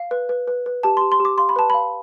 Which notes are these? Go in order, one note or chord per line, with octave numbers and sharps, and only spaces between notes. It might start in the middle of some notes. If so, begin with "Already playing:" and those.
Already playing: F5
B4
B4
B4
B4
G4 A5
G4 C6
C6
G4 D6
F5 C6
B5
B4 A5
F5 B5